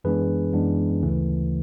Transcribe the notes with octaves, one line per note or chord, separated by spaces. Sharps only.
F#2 E3 G#3 B3 D4 G#4 B4
F#2 E3 G#3 B3 D4
D2 C#3 E3 A3